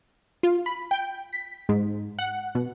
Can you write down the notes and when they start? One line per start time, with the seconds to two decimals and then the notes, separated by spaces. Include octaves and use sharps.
0.43 F4
0.66 B5
0.91 G5
1.33 B6
1.69 G#2
2.19 F#5
2.55 B2